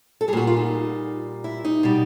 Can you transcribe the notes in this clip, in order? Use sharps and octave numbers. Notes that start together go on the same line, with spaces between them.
A4
G3 G#4
A#2 F#4
F4
D#4
E4
D#4
B2 G3